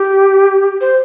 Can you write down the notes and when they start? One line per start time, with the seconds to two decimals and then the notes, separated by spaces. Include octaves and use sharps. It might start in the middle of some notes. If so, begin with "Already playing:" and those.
Already playing: G4
0.81 C5